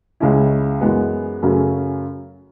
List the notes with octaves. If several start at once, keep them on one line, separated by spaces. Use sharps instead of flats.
C#2 C#3 G#3 C#4 E4
F#2 E3 G#3 B3
F#2 C#3 F#3 A3 C#4